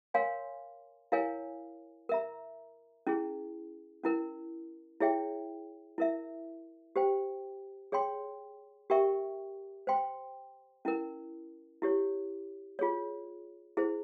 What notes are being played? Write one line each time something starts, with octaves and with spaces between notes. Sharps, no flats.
A#4 C#5 F5 G#5 C6
E4 A#4 C#5 F5 G#5
A#4 E5 A#5
C#4 E4 G#4
C#4 E4 A#4
E4 G#4 C#5 E5 G5
E4 A#4 E5
G4 C5 G5
G#4 C#5 G5 C6
G4 A#4 E5 G5 C#6
C5 G5 C6
C#4 E4 A#4
E4 G4 C#5
F4 G#4 C#5
E4 G#4 C5